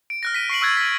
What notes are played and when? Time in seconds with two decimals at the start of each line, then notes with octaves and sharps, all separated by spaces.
0.10 D7
0.23 F6 F#6 A#6
0.34 B6 D#7
0.50 C#6 C7 D7 F#7
0.61 C#6 E6 F#6 G#6 A6
0.77 B6